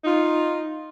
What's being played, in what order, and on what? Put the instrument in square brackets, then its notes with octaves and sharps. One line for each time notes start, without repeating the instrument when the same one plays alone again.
[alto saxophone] D#4 [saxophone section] F4